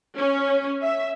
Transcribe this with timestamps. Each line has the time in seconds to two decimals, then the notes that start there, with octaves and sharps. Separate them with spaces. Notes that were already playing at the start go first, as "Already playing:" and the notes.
0.18 C#4
0.82 E5